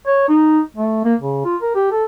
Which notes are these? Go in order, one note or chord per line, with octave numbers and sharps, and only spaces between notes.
C#5
D#4
A3
A#3
C#3
F4
A#4
G4
A4